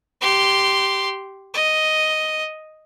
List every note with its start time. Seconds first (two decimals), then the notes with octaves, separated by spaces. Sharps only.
0.21 G4 C6
1.54 D#5